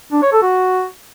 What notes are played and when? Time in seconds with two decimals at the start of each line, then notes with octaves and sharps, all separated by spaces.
0.12 D4
0.22 C#5
0.33 A4
0.43 F#4